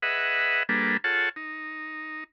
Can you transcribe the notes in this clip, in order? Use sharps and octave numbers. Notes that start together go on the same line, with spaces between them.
G#4 B4 D#5 E5 F#5
G3 A#3 D4 G#4 A4 B4
F4 G#4 A4 C#5 F#5 A5
D#4